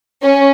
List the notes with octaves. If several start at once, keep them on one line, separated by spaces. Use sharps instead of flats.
C#4